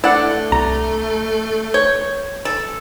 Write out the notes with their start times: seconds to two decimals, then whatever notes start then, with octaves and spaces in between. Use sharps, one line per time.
0.04 A3 D4 E4 F#5
0.52 C2 A#5
1.74 C#5 G6
2.45 A4